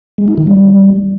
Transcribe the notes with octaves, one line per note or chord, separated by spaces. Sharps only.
G#3
D#4
D#3
G3